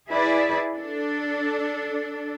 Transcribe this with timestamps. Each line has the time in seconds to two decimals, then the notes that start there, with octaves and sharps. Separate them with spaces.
0.10 E4 G#4 B4 D5
0.76 D4 A4